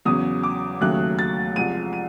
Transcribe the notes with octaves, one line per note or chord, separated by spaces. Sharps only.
E2 C#3 F#3 D#6
D6
D#2 C#3 F#3 A3 F#6
A6
C2 C3 F3 G#3 D#7
D#7